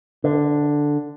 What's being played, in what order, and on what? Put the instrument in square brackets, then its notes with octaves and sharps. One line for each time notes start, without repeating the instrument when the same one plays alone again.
[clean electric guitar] D3